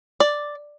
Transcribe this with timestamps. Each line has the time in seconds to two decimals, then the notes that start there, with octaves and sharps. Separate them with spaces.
0.20 D5